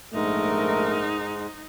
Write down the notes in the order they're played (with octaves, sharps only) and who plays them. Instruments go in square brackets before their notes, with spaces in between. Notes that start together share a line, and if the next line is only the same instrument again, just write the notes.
[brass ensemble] A#1 A3 A#4 [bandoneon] G#2 G#3 [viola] D#4